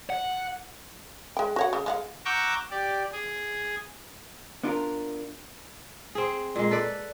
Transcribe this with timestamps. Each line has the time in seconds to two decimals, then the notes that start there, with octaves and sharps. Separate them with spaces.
0.10 F#5
1.37 G#3 G5
1.56 F#4 C#5 F#5
1.73 C#3
1.86 G#3 F5 F#5
2.25 F#5 A#5 C#6 D6 E6 G6
2.71 G4 D5
3.13 G#4
4.63 B3 D4 F4 A4 A#4
6.15 C4 G#4
6.56 A#2 G#3
6.71 A4 B4 D5